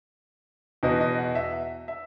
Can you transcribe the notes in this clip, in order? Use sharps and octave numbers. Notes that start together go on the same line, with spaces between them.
E2 B2 D#5
D#5
F#5
E5
E5